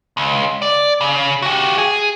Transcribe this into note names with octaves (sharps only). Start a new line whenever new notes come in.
C#2
D5
C#3
F#4 G4
G#4